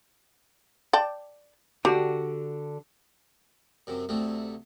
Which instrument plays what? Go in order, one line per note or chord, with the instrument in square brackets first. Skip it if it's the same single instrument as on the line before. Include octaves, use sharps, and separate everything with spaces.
[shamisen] D5 G5 A5
[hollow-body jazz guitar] D3 D4 F#4 [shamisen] G4
[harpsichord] F#2 C3
D2 C3 A3